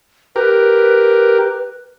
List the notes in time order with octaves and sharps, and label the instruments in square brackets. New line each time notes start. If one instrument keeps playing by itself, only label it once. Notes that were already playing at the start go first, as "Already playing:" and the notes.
[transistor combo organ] G4 A#4 [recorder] B4